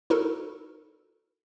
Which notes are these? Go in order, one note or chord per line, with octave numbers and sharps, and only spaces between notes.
D#4 E4 F#4 A4 A#4